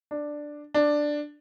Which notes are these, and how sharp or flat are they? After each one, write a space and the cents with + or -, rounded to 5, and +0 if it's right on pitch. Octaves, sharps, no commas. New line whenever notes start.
D4 +5
D4 +5